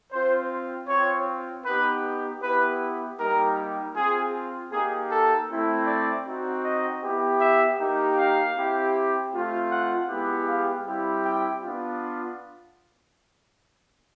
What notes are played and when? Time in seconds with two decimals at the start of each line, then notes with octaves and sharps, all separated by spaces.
0.12 C4 F4 C5
0.88 C4 F4 C#5
1.65 B3 D#4 G4 B4
2.42 B3 E4 G4 B4
3.19 G3 A#3 D#4 G4 A#4
3.95 C4 F4 G#4
4.72 A#3 D#4 G4 G#4
5.10 A4
5.49 A3 C4 E4
5.87 D5
6.25 C4 D#4 F#4
6.64 D#5
7.02 B3 E4 G4
7.41 E5
7.79 A#3 D#4 G4
8.17 F5
8.55 C4 E4 G4
9.32 A3 C4 F4
9.70 F#5
10.08 G#3 B3 E4 G4
10.47 F5
10.85 G3 C4 E4 G4
11.24 G5
11.62 B3 D4 F4